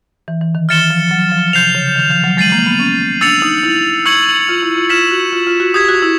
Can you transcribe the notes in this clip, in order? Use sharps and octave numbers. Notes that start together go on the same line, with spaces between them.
E3
E3
D#3
E3 F6 A6 C#7 E7 G7
F3
F#3
F3
C3 G6 C7 F7
C#3
D#3
F3
F#3
G#3 A6 C7 D#7 F#7
A#3
B3
C#4
D4 E6 A6 C#7 F7
D#4
E4
C#6 E6 G#6 C#7 F#7
F4
E4
F4
F4 G#6 B6 E7
F#4
F4
F4
F#4
G4 D#6 G#6 B6
F#4
E4